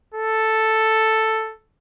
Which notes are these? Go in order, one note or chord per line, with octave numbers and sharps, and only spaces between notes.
A4